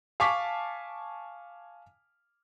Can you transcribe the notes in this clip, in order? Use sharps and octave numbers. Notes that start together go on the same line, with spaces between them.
F5 G#5 A5 C#6 D6 B6